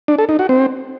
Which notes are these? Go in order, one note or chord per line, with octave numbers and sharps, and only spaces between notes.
D4
A4
D#4
F#4
C4